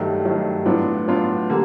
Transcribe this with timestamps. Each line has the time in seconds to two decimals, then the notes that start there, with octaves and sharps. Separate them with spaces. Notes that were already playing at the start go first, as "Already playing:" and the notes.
Already playing: G2 D#3 F#3 A3
0.24 G2 D#3 F#3 A3
0.66 A2 F#3 B3 D4 F4
1.08 A2 F#3 B3 D4 F4
1.49 D3 G3 A#3